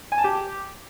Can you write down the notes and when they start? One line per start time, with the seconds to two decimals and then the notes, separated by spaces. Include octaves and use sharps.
0.12 G#5
0.18 A5
0.24 G4